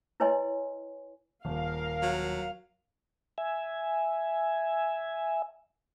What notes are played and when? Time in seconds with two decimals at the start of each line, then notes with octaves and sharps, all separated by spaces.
0.20 E4 B4 C#5 D#5 G#5 C6
1.45 D#1 A#4 F5
2.02 F#3
3.38 E5 G#5